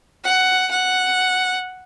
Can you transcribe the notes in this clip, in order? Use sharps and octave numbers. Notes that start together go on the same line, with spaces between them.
F#5
F#5